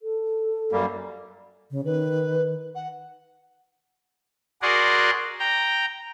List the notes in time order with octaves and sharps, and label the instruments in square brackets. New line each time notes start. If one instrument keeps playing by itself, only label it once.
[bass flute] A4
[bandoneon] F#2 G3 A#3
[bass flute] C#3
[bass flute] D#3 [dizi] B4
[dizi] F#5
[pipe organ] F#4 G#4 A#4 D5 F#5 C6
G5 A#5